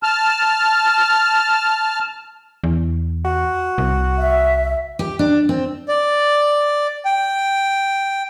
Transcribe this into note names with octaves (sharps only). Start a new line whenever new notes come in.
A5 F6
E2
F#4
C2
E5
G4
D4
C4
D5
G5